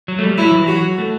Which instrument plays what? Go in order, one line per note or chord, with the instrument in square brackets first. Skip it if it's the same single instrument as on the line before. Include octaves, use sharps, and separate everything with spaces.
[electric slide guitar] F#3
A3
G3
[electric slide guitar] F#3 [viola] E4
[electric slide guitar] E3
[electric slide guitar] F#3 [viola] F#4
[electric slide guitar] A3